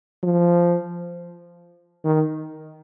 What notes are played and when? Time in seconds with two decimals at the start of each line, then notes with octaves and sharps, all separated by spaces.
0.23 F3
2.05 D#3